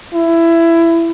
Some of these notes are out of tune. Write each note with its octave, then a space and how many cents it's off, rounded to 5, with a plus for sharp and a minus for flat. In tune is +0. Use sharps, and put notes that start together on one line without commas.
E4 +20